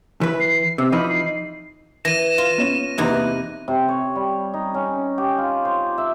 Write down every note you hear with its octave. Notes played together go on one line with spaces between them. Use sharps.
E3 B4
C7
C3 E6
E3 F3 D#4 B5
C7
E3 A#6 D#7 E7
F4
B3 C#4
E2 C3 A#3 D#4 E4 B4 F#6
C3
C#5
G3
D#4
C#4
G4
F4
C5
E5